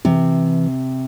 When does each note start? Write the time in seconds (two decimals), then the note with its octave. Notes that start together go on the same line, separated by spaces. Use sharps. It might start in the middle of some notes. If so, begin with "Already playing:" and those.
0.05 C3 E3